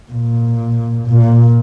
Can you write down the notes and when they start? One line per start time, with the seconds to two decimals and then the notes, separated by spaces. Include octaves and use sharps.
0.12 A#2
1.08 A#2